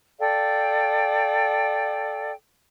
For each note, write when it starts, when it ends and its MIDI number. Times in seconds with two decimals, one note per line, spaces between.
0.19 2.32 69
0.19 2.32 74
0.19 2.32 77
0.19 2.32 79